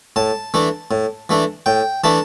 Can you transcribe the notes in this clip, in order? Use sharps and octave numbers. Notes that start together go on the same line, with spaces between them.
A2 A5
E3 A3 D4
A2
E3 A3 D4
A2 G5
E3 A3 D4 A5